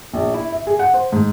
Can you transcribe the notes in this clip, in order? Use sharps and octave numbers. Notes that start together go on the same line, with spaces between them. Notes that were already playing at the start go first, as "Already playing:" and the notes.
A#1
E4
E5
G#4
F#5
C5
G#2